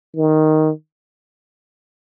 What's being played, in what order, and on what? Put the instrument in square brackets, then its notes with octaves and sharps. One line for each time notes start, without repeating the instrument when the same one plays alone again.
[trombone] D#3